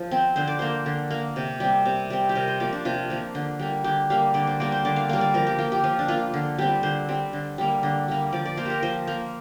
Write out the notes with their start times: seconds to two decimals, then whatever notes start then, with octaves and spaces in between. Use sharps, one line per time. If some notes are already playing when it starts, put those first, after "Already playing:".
Already playing: F3
0.11 C4
0.36 D3 C5
0.47 D5
0.59 A#3 C5
0.86 D3
1.11 A#3
1.36 C3
1.60 G3 C4
1.85 C3
2.10 G3 C4
2.29 G4
2.35 C3 A#4
2.48 C5
2.60 F3 A#3 D5
2.73 D4
2.85 C3 F4
3.10 F3 A#3
3.35 D3
3.60 G3 A#3
3.84 D3 G4
4.10 G3 A#3 F5
4.34 D3 D5
4.47 C5
4.60 G3 A#3 D5
4.72 C5
4.85 D3 D5
4.96 F5
5.09 G3 A#3 F5
5.21 D5
5.34 F3 A#4
5.47 G4
5.58 A#3 F4
5.72 G4
5.84 F3 F4
5.99 D4
6.08 A#3 F4
6.34 D3
6.58 G3 C4 G4
6.83 D3 C5
7.08 G3 C4
7.33 D3
7.58 G3 A#3
7.83 D3
8.08 G3 A#3
8.32 F3 D5
8.46 D5
8.57 A#3 C5
8.66 G4 A#4
8.83 F3 C5
9.07 A#3